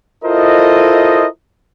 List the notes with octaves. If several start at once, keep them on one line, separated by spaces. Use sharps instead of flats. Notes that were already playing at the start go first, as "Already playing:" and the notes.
E4 F4 A4 A#4 C5 D#5